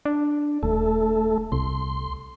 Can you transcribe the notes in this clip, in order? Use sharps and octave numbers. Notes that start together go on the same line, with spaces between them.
D4
D#1 A3 A4
C2 C6